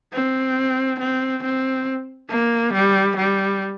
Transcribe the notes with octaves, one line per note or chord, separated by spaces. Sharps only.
C4
C4
C4
A#3
G3
G3